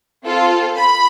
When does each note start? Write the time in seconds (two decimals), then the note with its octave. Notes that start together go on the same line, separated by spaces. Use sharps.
0.25 C4 F4 A4
0.77 B5